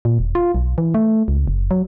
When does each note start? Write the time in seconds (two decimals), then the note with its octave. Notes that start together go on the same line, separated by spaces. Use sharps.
0.05 A#2
0.19 E1
0.35 F4
0.55 B1
0.78 E3
0.94 A3
1.28 C#2
1.48 F#1
1.71 F#3